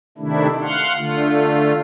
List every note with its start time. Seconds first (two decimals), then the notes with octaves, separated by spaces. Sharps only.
0.18 C3 D#3 A3 D4 E4
0.62 F5 F#5 C6
0.97 D3 A3 F4